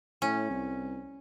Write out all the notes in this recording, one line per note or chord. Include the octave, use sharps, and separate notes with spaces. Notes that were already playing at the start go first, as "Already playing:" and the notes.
A2 C#4
C2